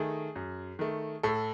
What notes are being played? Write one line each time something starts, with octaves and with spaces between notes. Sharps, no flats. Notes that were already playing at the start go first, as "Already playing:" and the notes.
Already playing: D#3 A3 G#4
F#2
D#3 A3
A2 A4